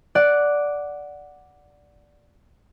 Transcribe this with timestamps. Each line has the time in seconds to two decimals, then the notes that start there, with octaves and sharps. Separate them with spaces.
0.15 D5 F#5